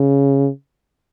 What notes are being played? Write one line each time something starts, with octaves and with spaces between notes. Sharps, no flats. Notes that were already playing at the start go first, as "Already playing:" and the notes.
Already playing: C#3